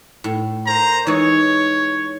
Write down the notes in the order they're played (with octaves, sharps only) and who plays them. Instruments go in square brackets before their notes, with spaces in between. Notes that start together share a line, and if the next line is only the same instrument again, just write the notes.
[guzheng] A2
[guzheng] A#4 [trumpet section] C5 A#5
[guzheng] E3 G#3 D#4 [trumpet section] C#5